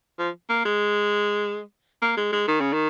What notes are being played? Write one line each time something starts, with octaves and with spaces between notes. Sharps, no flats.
F3
A#3
G#3
A#3
G#3
G#3
D#3
C#3
D#3